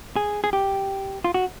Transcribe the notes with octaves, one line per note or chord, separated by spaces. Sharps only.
G#4
G#4
G4
F4
F#4